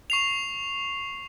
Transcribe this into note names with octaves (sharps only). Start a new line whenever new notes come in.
C#6 C7 F7